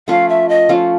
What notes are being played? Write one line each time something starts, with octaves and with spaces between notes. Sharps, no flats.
F3 A3 C#4 F4 F5
E5
D#5
F3 A3 C#4 F4